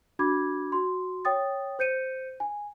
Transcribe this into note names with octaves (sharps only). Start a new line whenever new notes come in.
D4 F#4 B5 D6 G#6
F#4 C6
C#5 G5 D#6 A6
C5 G6 C#7 D#7
G#5